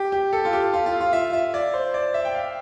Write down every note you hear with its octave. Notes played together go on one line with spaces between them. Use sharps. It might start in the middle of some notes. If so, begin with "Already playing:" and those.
Already playing: G4
G4
A4
F4
G4
F4
F4
F4
E5
E5
D5
C5
D5
E5
G5
F5